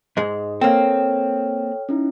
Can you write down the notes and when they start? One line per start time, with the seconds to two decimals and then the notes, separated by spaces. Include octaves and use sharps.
0.17 G#2 G#3 D#5
0.61 A#3 C4 A4 C#5 G5 F6
1.89 C#4 D#4 E4